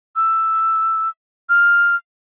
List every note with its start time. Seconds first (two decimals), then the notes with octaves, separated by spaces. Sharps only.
0.16 E6
1.49 F6